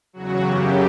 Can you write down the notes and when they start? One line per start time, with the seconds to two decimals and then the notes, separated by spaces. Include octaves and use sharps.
0.13 E2 C#3 F#3 F#4
0.43 F#2 C#3 F#3 G4